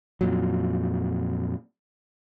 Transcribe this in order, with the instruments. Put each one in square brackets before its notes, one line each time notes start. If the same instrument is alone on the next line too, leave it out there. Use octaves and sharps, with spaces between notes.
[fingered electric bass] F2 A#2 F#3